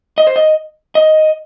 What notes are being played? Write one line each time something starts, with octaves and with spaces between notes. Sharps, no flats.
D#5
C5
D#5
D#5